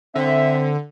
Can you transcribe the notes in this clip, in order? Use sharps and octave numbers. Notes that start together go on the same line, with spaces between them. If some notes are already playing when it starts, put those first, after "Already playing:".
D3 C4 E5